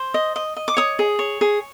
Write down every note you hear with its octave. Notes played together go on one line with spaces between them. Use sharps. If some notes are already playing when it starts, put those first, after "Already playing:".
Already playing: C5
D#5
D#5
D#5
D6
C#5 D#6
G#4
C#5
G#4